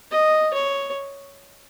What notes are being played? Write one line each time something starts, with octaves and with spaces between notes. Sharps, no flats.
D#5
C#5